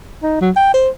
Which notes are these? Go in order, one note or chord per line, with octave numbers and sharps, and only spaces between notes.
D#4
F#3
G5
C5